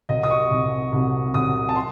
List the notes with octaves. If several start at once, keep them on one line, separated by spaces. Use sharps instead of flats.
C2 C3 F#3 D#5
D#6
C#6
C2 C3 F#3
C2 C3 F#3
C2 C3 F#3 D#6
A5
C6